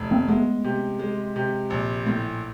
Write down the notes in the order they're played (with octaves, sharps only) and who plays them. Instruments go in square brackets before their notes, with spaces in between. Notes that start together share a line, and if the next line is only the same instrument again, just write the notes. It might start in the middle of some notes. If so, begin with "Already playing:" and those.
Already playing: [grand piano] F1
[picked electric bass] A#3 C4
[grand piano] G#3 [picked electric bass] A3 B3
[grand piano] C3
G#3
C3
A#1
A2